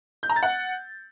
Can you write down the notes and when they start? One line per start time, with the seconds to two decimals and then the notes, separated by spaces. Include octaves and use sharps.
0.23 G6
0.29 A#5
0.36 A6
0.43 F#5